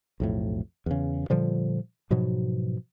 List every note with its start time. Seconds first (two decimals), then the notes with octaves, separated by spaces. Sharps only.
0.20 B1 F2 A2
0.86 E2 C#3
1.30 A#2 D3 F3 G3
2.10 G#2 B2 F3 F#3